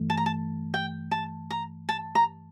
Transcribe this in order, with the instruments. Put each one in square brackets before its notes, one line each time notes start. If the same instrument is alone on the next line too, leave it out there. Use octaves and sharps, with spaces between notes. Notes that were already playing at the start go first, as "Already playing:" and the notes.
Already playing: [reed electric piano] G2 E3 A3
[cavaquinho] A5
A#5
A5
G5
A5
A#5
A5
A#5